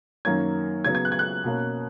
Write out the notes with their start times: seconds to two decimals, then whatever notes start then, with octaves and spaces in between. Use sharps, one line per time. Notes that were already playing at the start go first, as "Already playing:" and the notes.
0.25 F#2 D#3 A#3 C#4 G#6
0.85 C#3 F#3 B3 G#6
0.95 G#6
1.05 F#6
1.12 G#6
1.19 F#6
1.44 B2 A#3 C#4